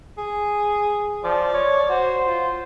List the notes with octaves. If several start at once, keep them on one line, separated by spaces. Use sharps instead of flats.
G#4
F3 D5
C#5
F#4 C5
F4